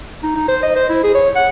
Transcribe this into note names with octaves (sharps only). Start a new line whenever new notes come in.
D#4
D#4
C5
D#5
C5
E4
G#4
C#5
F#5